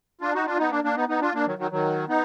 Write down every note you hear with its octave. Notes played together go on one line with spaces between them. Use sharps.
D4 F4
D#4 F#4
D4 F4
B3 D#4
A#3 D4
A#3 D4
B3 D#4
B3 D#4
D4 F4
A#3 D4
D#3 F#3
D#3 F#3
D#3 F#3
B3 D#4